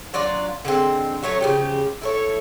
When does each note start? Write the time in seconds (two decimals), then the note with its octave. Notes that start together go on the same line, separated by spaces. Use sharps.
0.14 F#3 D4 F4 D5
0.65 D3 G#3 C4
1.23 F#3 A3 C#4 C#5
1.41 C#3 F3 G4
2.01 E4 A4 C#5